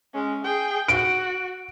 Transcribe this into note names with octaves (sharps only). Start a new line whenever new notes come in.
G#3 C#4
G#4 G5
F#4 D7